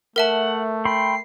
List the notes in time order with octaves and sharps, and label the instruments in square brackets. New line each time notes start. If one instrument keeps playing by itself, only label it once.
[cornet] A3 [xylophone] A#4 E5 A5 [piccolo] F#5
[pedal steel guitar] G5 B5 C6 [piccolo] C7